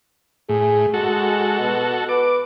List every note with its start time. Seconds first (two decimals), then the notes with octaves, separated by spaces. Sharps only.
0.49 A2 G#4
0.94 G#3 F#4 A4
1.60 B2
2.09 B4 D6